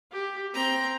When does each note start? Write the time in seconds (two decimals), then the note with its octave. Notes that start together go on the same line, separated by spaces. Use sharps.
0.12 G4
0.54 C4 G5 A#5